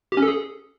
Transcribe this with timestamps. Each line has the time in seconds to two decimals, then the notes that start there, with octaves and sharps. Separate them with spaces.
0.12 G4
0.17 C#4
0.22 A4
0.28 G#4